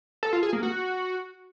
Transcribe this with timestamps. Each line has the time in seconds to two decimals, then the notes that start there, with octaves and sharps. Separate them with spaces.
0.23 A4
0.33 F4
0.43 G#4
0.53 A#3
0.63 F#4